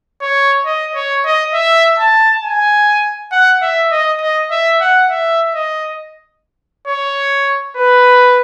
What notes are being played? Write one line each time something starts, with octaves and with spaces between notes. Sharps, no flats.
C#5
D#5
C#5
D#5
E5
A5
G#5
F#5
E5
D#5
D#5
E5
F#5
E5
D#5
C#5
B4